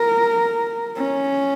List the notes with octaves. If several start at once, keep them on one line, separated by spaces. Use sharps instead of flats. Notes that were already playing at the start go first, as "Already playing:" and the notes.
Already playing: A#4
C#4